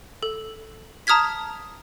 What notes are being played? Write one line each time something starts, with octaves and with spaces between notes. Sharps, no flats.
A4
A5 A#5 D#6 F6 G#6 B6